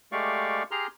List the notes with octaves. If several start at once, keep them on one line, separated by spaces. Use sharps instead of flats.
G#3 A3 G4 D5 F5 C#6
G4 G#4 A#5 C6 F6